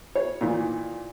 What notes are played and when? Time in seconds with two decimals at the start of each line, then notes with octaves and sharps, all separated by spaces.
0.15 C#5
0.41 A#2 D#3 E3